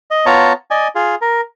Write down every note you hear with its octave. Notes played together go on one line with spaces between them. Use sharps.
D#5
B3 F4 C#5 A5 A#5
D5 D#5 G#5
F4 G#4
A#4